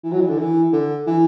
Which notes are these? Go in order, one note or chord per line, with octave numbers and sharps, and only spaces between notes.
E3
F#3
E3
D3
E3
D3
E3